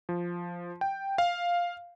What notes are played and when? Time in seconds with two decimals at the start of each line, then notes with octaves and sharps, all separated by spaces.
0.09 F3
0.81 G5
1.18 F5